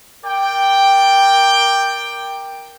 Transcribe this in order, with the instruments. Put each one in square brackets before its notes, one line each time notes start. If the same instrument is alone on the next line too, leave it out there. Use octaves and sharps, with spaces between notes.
[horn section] A#4 D5 G5